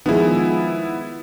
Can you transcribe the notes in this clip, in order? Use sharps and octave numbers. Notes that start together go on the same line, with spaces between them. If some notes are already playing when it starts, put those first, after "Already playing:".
D#3 F3 G#3 B3 E4